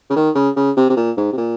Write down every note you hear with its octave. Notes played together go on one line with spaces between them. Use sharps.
C#3
D#3
C#3
C#3
C3
C3
A#2
G#2
C3
A#2